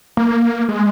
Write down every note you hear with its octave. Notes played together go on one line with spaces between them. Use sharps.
A#3
G#3